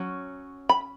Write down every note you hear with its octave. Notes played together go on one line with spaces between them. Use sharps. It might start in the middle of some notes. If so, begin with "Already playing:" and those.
Already playing: F#3 C#4
B5